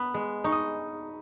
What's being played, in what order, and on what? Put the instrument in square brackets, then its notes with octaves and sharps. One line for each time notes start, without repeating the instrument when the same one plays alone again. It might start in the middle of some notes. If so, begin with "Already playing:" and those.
Already playing: [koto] B3 [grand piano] B5
[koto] G#3
[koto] D#4 [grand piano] C#6
[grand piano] D#6